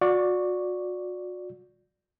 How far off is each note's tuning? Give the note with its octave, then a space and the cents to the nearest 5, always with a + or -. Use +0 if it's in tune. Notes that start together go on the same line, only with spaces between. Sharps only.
F#4 -35 D5 +0 C#6 +0